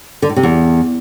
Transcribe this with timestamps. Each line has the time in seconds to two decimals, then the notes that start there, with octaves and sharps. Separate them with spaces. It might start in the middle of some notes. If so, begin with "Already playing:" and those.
0.22 D3
0.29 A2
0.36 C3
0.43 E2